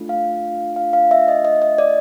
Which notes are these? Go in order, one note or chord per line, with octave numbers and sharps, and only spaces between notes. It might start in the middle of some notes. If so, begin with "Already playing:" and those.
Already playing: A3 D4 F4 A4
F5
F5
F5
E5
D#5
D#5
D#5
D5